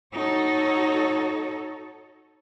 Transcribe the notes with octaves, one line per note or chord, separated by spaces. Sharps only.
D#4 F#4 A4 C#5